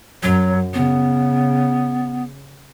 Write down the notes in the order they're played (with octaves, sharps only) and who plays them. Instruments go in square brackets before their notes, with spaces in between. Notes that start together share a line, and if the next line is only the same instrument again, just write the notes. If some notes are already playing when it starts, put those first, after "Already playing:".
[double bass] F#2 [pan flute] F#3
[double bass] C#3 [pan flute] B3